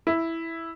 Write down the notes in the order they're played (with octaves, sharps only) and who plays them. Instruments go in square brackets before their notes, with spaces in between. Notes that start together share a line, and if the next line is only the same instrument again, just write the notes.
[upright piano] E4